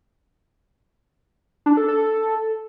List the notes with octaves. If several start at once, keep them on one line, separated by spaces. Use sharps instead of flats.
D4
A4
A4